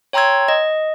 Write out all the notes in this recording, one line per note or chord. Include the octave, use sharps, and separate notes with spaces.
C#5 G5 A#5 C6 E6 G#6
D#5